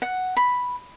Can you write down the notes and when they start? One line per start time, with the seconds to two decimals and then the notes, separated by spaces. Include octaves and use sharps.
0.02 F#5
0.37 B5